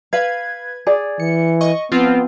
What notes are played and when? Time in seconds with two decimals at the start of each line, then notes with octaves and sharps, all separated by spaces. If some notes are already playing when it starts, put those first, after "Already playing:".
0.13 B4 F5 G#6
0.87 G#4 D5
1.20 E3 C#7
1.61 D#5 C#6
1.92 F3 B3 C4 F4